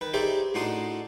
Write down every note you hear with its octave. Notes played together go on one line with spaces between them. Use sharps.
D#3 B4
D#4 G4 G#4 C5 D5 E5
A2 D4 D#4 F#4 C6 D#6